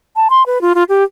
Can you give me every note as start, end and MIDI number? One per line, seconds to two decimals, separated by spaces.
0.16 0.28 81
0.30 0.43 84
0.46 0.61 71
0.61 0.73 65
0.75 0.83 65
0.89 1.03 67